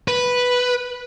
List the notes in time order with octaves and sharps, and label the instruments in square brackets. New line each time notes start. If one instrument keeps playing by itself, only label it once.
[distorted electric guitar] B4